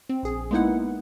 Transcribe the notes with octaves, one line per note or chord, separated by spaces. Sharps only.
C4
A#1 G#4
G#3 A#3 B3 D#4 E4 F#5